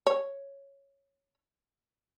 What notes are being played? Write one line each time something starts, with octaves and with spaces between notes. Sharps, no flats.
C#5